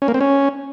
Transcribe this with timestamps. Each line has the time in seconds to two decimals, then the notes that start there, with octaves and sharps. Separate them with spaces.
0.02 C#4
0.08 A#3
0.14 C4
0.21 C#4